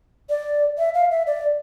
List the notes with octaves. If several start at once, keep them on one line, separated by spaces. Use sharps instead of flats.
D5
E5
F5
E5
D5